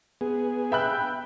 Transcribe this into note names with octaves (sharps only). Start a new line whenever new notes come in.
B3 G#4
E5 G5 B5 F#6